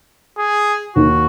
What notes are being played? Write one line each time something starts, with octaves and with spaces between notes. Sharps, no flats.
G#4
D#2 D#3 A#3 F#4